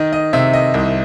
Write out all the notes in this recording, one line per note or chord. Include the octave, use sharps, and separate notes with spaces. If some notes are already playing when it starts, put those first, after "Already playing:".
Already playing: D#3 D#5
D#5
C3 E5
D#5
C2